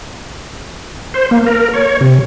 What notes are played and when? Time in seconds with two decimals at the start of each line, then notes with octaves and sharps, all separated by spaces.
1.14 C5
1.31 A#3
1.46 A#4
1.74 C#5
2.01 C3